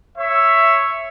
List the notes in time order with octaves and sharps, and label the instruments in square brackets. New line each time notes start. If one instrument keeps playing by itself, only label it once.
[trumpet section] C#5 E5